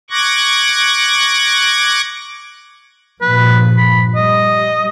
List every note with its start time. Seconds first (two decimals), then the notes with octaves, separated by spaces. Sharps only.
0.10 C#6 D6 F#6 G#6 A#6
3.21 G2 A#2 F3 B4
3.78 B5
4.15 G3 D#5